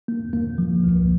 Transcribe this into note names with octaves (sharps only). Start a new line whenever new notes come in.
A#3
A#3
F3
C#2